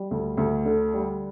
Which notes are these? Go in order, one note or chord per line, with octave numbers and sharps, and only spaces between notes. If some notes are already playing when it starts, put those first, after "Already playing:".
Already playing: G3
D2
D2
D3
G3